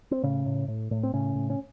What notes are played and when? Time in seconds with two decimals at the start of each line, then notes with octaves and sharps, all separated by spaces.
0.11 C4
0.23 A2 C#3 C#4
0.46 A2
0.68 A2
0.91 A2
1.03 C4
1.13 A2 C#3 C#4
1.35 A2
1.50 C#4